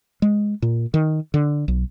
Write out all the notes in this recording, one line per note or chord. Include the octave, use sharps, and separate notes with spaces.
G#3
A#2
D#3
D3
B1